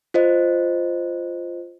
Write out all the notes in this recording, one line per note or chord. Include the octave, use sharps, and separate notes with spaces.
F4 C5 D#5